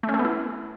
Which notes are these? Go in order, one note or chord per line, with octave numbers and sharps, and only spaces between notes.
A3
C#4
A3
B3
E4